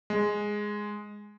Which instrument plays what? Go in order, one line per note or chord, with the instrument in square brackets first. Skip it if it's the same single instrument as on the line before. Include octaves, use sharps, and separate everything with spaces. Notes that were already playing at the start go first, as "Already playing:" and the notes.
[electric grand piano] G#3